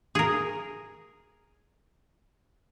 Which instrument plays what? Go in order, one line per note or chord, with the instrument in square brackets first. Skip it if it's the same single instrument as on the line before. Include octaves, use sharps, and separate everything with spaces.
[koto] G#4 A#4